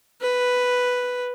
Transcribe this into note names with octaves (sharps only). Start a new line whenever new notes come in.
B4